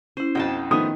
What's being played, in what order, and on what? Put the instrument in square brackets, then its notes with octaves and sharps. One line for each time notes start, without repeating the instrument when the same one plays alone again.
[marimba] C#4 E4 [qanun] C5
[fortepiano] B1 F2 [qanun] D#5 G5 A5
[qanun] D#3 [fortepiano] F3 A3 B3 [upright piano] D#6